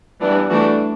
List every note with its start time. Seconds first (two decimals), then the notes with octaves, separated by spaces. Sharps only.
0.21 E3 G3 B3 D4
0.50 E3 A3 D4 F#4